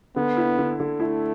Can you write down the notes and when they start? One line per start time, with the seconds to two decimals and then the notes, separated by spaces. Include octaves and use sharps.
0.16 D3 B3
0.37 E4
0.58 D3
0.80 D3
1.00 A3 E4